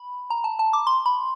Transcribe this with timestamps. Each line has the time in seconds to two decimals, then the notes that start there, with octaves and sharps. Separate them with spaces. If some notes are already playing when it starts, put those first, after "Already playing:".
Already playing: B5
0.30 A#5
0.44 A5
0.59 A5
0.73 D6
0.87 C6
1.06 B5